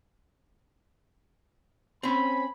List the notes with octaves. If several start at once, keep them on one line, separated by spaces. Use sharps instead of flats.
C4 C#4 B5